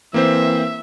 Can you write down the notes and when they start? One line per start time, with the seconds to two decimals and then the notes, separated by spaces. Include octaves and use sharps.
0.14 E3 A#3 C4 C5 E5